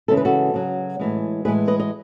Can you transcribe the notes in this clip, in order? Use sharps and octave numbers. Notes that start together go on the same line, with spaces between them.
C#3 E3 G#3 A4
B4
F#4 A4
C#3 F#3
A2 E3 G#3
A2 E3 G#3 G#4 B4
B4 D#5
D#5